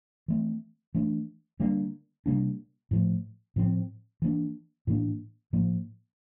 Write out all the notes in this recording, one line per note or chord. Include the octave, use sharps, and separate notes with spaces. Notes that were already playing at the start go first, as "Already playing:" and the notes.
E3 A3 C4
E3 A3 D4
D3 G3 A#3 D4
C3 G3 A#3 D4
A2 F3 A3
A2 F3 C4
E3 A#3 D4
A2 E3 A#3 D4
A2 F3 A#3